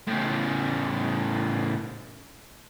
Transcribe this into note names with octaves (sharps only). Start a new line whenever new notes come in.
A2 C#3